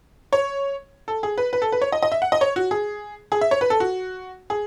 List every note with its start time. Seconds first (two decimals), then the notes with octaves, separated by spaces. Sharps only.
0.33 C#5
1.08 A4
1.23 G#4
1.38 B4
1.53 B4
1.62 A4
1.72 B4
1.82 C#5
1.92 D#5
2.02 D#5
2.12 E5
2.22 F#5
2.32 D#5
2.41 C#5
2.56 F#4
2.71 G#4
3.32 G#4
3.41 E5
3.51 C#5
3.61 B4
3.70 A4
3.80 F#4
4.50 G#4